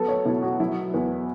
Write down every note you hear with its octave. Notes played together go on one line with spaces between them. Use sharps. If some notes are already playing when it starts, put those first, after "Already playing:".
Already playing: F#3 B3 A4
C#5
B2 E4
F#4
F#3 E4
E2 B4